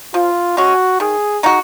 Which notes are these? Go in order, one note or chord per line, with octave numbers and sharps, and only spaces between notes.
F3 F4
G#3 C#4 F#4
D#3 G#4
G#3 D#4 F#4